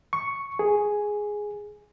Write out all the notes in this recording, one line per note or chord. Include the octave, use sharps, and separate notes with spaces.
C#6
G#4